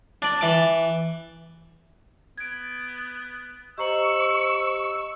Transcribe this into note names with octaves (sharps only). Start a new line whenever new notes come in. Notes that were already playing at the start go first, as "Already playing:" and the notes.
D4 D5
E3 D6
B3 G#6 D7
G4 C5 D#5 A#5 C#6 E6 F#7